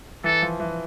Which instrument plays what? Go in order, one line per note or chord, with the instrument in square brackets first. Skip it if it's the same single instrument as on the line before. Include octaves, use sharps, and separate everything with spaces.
[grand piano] E3 [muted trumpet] A4
[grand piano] F3
E3